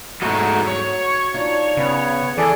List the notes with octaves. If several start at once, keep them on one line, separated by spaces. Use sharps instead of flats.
E2 G#2 G#3 A3 D#4 F#4
C#5
D4 D#4 F4
C#3 B3
E3 G#4 A4 D5